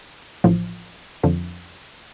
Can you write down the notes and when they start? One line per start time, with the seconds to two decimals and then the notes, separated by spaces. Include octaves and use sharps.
0.44 A1 A2 F3
1.24 F2 D3 F3